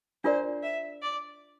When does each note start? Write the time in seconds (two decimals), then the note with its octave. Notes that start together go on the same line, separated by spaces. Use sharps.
0.24 D4 F4 A#4 C5 D5
0.63 E5
1.02 D5